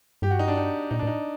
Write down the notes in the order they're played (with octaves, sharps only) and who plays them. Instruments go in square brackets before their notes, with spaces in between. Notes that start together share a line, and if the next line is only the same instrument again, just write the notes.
[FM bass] G2 [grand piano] G4
[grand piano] F#4
D#4
D4
D#4
[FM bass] A#2 [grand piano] D#4
[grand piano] D4
[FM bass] A2
[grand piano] D#4